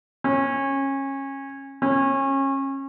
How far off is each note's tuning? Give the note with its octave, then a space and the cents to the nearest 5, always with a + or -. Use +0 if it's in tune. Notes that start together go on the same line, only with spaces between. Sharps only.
C#4 -25
C#4 -30